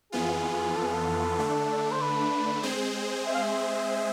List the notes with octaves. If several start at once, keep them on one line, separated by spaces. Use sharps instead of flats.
F2 E3 B3 F4 G#4
A4
G#4
A4
D3 A3 D4
C5
B4
G#3 C4 G#4 C5
E5
F5
E5